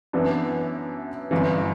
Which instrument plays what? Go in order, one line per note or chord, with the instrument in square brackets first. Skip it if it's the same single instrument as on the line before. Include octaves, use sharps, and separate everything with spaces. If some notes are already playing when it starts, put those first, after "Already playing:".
[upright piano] F#2 E3 B3 D4
G1 F#2 E3